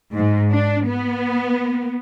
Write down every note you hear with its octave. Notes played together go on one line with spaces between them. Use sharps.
G#2
D4
B3